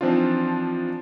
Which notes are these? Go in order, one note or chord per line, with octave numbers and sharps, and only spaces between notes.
E3 F3 C4 D4 D#4 F4